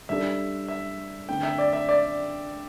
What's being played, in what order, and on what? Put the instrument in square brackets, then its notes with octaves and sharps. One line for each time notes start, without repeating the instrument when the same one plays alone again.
[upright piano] G3 D4 A4 [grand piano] E5
[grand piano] E5
[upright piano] D3 A3 C4 [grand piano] G5
[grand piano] E5
D5
E5
D5